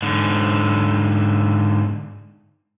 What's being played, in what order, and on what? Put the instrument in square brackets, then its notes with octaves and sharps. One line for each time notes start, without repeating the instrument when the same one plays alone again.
[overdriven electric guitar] G#2 D3